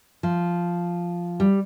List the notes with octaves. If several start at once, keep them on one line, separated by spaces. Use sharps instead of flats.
F3
G3